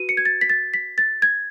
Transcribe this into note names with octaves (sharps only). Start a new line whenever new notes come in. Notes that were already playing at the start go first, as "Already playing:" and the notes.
Already playing: F#4 B4 D#7
C#7
G#6
A6
B6
A6
B6
A6
G#6